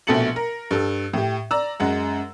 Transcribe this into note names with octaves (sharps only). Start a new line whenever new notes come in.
A#1 B2 A3 A5 C#7 F#7
A#4
G2 A4
A2 G4
D5 A#5 E6
F#2 G#3 F#5